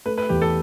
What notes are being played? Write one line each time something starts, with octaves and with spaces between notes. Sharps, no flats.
A3 B4
B4
E2 G4
A4